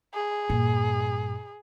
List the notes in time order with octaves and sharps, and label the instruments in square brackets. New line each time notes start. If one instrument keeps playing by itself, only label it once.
[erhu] G#4
[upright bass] G2 A#2